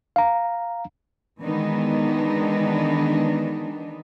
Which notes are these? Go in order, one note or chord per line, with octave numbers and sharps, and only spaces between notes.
F5 A#5
D#3 E3 G#3 B3 D4 D#4